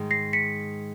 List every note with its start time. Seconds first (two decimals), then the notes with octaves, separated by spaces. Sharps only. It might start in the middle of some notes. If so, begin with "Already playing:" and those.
Already playing: G#2 D#3 G#3
0.11 A#6 C7
0.33 B6 C#7